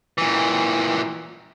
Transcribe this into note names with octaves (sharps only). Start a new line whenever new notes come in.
A#2 E3